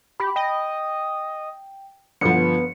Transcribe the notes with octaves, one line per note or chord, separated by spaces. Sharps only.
G4 B5
D#5 G5
G1 F3 B3 C#7